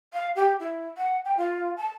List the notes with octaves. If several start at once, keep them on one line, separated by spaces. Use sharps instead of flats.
F5
G4
E4
F#5
G5
F4
A5